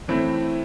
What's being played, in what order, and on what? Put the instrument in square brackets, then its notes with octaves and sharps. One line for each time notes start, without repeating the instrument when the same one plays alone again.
[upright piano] A2 E3 A3 C4 E4